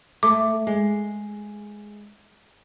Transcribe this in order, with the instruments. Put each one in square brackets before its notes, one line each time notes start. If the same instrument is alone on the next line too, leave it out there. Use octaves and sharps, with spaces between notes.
[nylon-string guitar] A3 [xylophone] D6
[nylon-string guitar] G#3